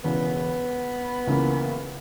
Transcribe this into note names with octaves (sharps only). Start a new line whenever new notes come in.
E1 E2 C#3 B3
C#2 C#3 E3 A#3 E4